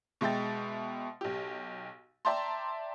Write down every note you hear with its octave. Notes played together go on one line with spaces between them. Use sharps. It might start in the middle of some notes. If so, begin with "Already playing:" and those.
B2 G#3 E5 G5 A6
B1 G4
D5 E5 G5 A5 A#5 C6